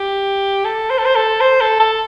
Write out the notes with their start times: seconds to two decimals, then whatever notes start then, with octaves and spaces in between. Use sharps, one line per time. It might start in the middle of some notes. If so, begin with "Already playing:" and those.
Already playing: G4
0.65 A4
0.90 C5
0.98 A4
1.05 C5
1.15 A4
1.41 C5
1.61 A4
1.80 A4